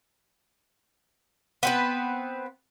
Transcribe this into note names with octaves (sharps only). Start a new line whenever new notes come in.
B3 C4 B4